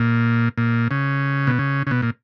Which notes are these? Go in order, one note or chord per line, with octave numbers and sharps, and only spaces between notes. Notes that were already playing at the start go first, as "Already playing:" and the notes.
Already playing: A#2
A#2
C#3
B2
C#3
C#3
B2
A#2